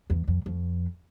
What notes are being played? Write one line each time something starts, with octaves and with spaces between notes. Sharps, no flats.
E2
F2
F2